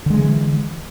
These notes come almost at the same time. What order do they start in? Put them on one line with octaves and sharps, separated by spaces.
D3 G#3 F3 E3